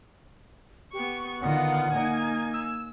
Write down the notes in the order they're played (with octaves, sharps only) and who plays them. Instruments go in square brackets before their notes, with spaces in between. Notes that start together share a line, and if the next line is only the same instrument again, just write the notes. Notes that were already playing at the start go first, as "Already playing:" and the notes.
[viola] B3 C#6 [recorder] G4
[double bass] D3 D#3 [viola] B3 F4 [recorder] F#5
[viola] A#3 G#5 [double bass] D#4
[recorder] E6